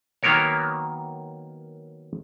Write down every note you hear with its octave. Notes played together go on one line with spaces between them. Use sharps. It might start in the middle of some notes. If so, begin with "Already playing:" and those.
D#3 F#3 A#3 B3 A#4 C#5